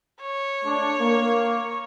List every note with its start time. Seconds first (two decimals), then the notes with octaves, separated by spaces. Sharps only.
0.22 C#5
0.64 A3 D4
0.99 A#3